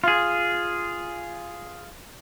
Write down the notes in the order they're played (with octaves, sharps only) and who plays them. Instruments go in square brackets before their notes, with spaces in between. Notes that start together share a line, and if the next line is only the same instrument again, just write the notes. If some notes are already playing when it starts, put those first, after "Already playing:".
[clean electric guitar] F4 G#4